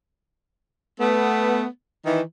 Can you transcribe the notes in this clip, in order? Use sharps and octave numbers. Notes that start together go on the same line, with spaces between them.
A3 B3
D#3 E3